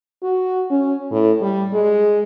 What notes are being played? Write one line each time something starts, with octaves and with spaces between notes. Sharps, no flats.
F#4
C#4
A2
G3
G#3